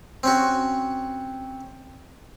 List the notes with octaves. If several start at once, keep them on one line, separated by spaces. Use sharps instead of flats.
C4 C#4 F#4